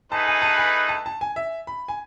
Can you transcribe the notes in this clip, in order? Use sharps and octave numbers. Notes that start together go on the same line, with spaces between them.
A3 D#4 G#4 B4 A5
G#5
A5
G#5
A5
A5
G#5
E5
B5
G#5